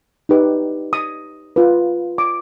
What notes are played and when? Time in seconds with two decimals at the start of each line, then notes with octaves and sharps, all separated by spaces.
0.29 D#4 G4 B4
0.93 D#6
1.56 F4 B4
2.18 D6